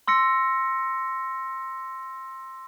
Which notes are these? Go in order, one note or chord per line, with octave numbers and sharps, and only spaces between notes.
C6 E6 A#6 C#7